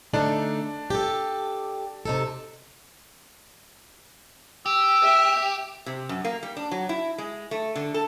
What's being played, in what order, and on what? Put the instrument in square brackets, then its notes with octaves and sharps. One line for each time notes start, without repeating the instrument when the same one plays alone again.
[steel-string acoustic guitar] D3 A3 D#4 [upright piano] D4
[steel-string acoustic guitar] G4 A4
C3 D#4 A4
[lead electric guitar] G4 [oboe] E6
[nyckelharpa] E5
[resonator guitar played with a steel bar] C3
F#2
A#3
G3
D4
F#3
E4
G#3
A3
D3
A4